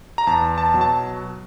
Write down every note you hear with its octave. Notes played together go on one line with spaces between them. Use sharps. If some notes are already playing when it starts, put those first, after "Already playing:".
A#5
E2 A5
A5
B2 F#3
A5